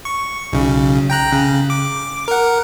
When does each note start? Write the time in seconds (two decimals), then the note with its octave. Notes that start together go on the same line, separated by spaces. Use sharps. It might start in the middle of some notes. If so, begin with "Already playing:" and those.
0.05 C#6
0.53 B1 C#3
1.10 G5 A#5 F#6
1.32 C#3
1.70 D6
2.28 A#4 F#5